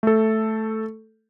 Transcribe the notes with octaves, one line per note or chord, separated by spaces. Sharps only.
A3 A4